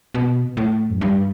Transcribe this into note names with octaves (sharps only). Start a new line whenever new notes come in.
B2
A2
F#2
G2